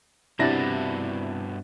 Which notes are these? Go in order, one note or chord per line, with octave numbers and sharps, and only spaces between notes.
G2 C3 B3 D4 E4 F#4 A6 A#6